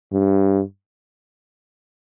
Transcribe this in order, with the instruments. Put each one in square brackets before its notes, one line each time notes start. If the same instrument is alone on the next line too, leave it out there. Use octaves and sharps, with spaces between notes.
[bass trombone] G2